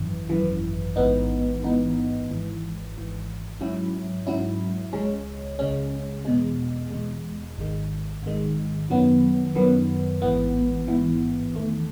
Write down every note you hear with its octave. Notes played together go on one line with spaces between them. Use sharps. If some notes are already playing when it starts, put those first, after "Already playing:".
Already playing: G#1 F#2 E3
G#1 F#2 E3
A1 G#2 E3 B3 D#4
A1 G#2 E3 B3 D#4
G#1 G#2 E3
G#1 G#2 E3
G#2 F#3 C#4 E4
G#2 F#3 C#4 E4
C#2 C#3 G#3 C#4
C#2 C#3 G#3 C#4
E2 B2 G#3
E2 B2 G#3
G#1 G#2 D#3 G#3
G#1 G#2 D#3 G#3
F#2 D#3 F#3 B3
F#2 D#3 F#3 B3
A1 G#2 E3 B3
A1 G#2 E3 B3
E2 D#3 A3